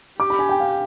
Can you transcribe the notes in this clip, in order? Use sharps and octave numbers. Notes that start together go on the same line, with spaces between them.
G4 D6
B5
G#5
G5
F5